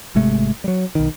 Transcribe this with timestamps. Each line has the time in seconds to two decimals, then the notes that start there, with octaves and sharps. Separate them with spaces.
0.15 G#1 C3 G#3 A3
0.64 F#3 G3
0.95 B1 D#3